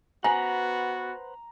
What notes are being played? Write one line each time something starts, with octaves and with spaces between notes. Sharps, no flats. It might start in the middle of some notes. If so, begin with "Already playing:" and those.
B3 F#4 B4 C5 F#5 G#5 A#5